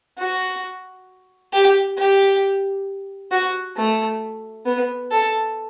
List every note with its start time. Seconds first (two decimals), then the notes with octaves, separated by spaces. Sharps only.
0.18 F#4
1.53 G4
1.98 G4
3.31 F#4
3.77 A3
4.65 B3
5.11 A4